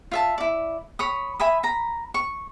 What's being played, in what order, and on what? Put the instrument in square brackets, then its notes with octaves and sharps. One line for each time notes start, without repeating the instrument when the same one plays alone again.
[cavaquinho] F4 E5 A5
E4 D5
C#5 B5 D#6
E5 G#5 B5 D#6
A#5 B5
C#6